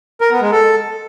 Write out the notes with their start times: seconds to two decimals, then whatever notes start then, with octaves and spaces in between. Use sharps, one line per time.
0.21 A#4
0.31 B3
0.41 G#3
0.52 A4